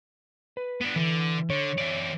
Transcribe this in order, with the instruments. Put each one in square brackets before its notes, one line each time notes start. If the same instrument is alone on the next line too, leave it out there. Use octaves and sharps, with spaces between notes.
[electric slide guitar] B4
[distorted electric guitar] B3 D4
[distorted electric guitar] D3 [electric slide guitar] E3
[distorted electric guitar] D3 [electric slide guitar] C#5
[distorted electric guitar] E3 D5